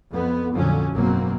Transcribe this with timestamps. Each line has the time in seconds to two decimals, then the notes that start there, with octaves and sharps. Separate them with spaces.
0.11 F2 B3
0.53 F2 A#2 D3 F3 F#3 C#4
0.93 G#1 F#2 B2 F#3 A#3 C4